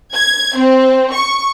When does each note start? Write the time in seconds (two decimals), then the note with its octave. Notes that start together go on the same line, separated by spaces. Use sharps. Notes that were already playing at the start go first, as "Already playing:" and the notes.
0.13 G#6
0.57 C4
1.13 C#6